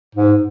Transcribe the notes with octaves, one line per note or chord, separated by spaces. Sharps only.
G#2